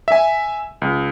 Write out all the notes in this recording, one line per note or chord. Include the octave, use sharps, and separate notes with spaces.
E5 G#5
C#2